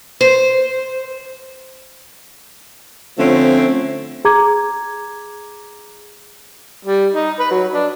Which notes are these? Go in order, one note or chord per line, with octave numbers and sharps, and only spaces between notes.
C5
D3 F3 A3 C4 C#4
G#4 A#5 D6 G#6
G3
D#4
B4
F#3
D4